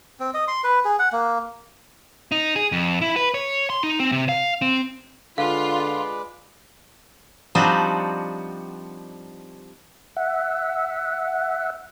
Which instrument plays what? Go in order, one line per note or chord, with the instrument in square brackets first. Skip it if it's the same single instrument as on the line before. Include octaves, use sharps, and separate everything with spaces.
[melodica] C4
D#5
C6
B4
G#4
F#5
A#3
[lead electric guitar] D#4
G#4
F2
E4
B4
C#5
C6
D#4
C4
C3
F5
C4
[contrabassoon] D3 [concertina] G#3 B4 D5 [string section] F4 [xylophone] F5
[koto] F3 G3 C4 D4 D#4 F#4
[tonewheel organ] E5 F#5